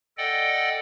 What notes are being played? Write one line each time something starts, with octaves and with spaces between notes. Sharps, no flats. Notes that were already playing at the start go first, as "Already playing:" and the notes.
A4 D5 D#5 F#5 G5